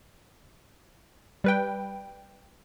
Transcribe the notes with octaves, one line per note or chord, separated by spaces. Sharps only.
G3 B4 G5